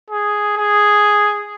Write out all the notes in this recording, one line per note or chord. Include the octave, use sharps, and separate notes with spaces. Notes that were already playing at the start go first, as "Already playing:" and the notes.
G#4
G#4